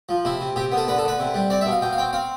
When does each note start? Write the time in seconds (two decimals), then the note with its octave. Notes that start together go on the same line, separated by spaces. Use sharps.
0.09 F3
0.25 C3 E4
0.41 C3
0.56 C3 G4
0.72 B3
0.77 A4
0.87 D3 B4
0.98 A4
1.04 D3 B4
1.20 C3
1.34 G3
1.50 C4 D5
1.61 E5
1.66 B2
1.71 F5
1.81 B2 G5
1.93 F5
1.98 C4 G5
2.13 C4 F5